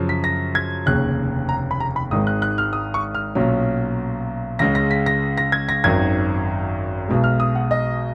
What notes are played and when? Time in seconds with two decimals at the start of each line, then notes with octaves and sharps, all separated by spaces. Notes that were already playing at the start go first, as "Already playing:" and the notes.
Already playing: F#2 C#3 F3
0.09 B6
0.24 A#6
0.55 G#6
0.86 F1 D#2 C#3 F#6
1.49 A#5
1.71 B5
1.80 A#5
1.96 B5
2.11 G#1 G#2 D#3 G#3 D#6
2.27 F#6
2.42 F#6
2.58 F6
2.73 D#6
2.94 C#6
3.14 F6
3.35 B1 A#2 F#3 C#4
4.59 C#2 C#3 G#3 A#6
4.75 A#6
4.91 B6
5.06 A#6
5.37 A#6
5.52 G#6
5.69 A#6
5.84 G#1 F#2 D#3 G#6
7.08 B1 B2 G#3
7.24 F6
7.40 D#6
7.55 F#5
7.71 D#5